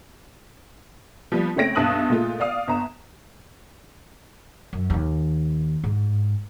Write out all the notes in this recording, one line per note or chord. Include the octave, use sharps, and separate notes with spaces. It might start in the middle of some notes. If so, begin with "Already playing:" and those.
F3 G3 B3
C#3 A3 C4 C#5 A#6 D7
B1 G2 E5 D#6 F#6 F#7
A#2 G#3 A3 F4
D5 F5 D#6
G1 A#5 E7
F#2
D#2 D#3
G#2